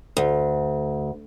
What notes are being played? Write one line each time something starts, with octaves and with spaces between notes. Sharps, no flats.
D2